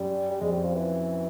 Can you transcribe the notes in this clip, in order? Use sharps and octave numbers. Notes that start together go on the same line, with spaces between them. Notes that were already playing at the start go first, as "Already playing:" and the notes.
Already playing: F#2 G3
G3
F2 G#3
G3
F3
E3